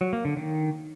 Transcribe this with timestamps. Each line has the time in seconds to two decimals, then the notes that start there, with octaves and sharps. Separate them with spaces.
0.01 F#3
0.13 A#3
0.25 D3
0.37 D#3